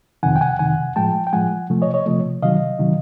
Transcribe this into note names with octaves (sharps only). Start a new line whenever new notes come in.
F2 C3 D#3 F#5 G#5
G5
F#5 G#5
F2 C3 D#3 F#5 G#5
A2 F3 G#3 G5 A5
G5
A2 F3 G#3 F#5 G#5
C3 F3 A3
C#5 D#5
C#5 D#5
C3 F3 A3
C3 D#3 F#3 D#5 F5
C3 D#3 F#3